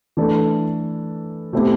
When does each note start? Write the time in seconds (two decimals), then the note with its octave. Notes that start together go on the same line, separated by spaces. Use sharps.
0.17 E3 A3 D4 A4
1.53 B2 A3 C4 E4 G4